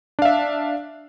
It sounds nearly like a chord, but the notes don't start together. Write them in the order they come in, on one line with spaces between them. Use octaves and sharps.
D4 F5 E5